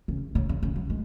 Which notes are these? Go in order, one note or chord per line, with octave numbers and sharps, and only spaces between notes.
C#3
C#3
C#3
C#3
F#3
G#3